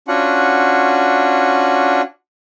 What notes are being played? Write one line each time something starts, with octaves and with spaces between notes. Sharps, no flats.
C#4 D4 F4 F#4 F#5